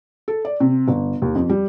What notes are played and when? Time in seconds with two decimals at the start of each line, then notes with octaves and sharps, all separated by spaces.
0.28 A4
0.45 D5
0.60 C3
0.88 G1
1.22 D#2
1.35 F2
1.50 G3